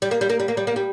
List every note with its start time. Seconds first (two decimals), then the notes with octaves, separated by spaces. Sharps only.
0.02 G3
0.11 A#3
0.21 G3
0.30 A#3
0.40 G3
0.48 A#3
0.57 G3
0.67 A#3
0.76 G3